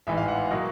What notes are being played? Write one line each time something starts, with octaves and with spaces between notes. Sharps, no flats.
A1 G#2 E3 E5
F5
F#5
B2 F#3 A#3 D#5